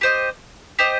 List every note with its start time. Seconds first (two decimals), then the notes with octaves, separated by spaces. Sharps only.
0.01 G4 C5 D#5
0.79 G4 C5 D#5